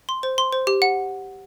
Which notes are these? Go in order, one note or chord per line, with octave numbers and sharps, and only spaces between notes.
C6
C5
C6
C5
G4
F#5